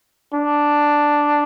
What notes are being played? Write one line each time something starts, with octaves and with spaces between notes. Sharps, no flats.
D4